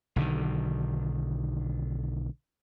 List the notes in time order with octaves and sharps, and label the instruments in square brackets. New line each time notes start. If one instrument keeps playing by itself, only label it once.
[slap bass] B1 D3 D#3